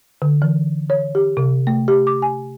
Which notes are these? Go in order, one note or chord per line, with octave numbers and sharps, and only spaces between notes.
D3
E3
C#5
G4
C3
A3
G4
D6
G#5